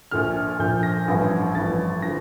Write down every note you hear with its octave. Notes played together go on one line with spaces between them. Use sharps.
A#1 A#2 F3 F6
A#1 A#2 F3 G6
A#6
A1 G2 F3
A1 G2 F3 A6
D3 F3 A#6